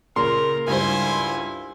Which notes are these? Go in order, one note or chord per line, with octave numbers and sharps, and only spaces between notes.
A#2 C#3 A#4 C6
C#2 G2 E4 C5 G#5